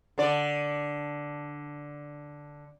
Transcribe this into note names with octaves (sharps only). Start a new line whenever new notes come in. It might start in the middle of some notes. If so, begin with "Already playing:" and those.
D3 D5